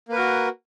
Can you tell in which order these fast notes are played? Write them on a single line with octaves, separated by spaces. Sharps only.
A#3 B4 A#4 F#4